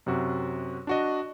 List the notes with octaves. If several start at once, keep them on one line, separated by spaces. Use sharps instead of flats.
F#2 C3 F#4
D4 F#4 D#5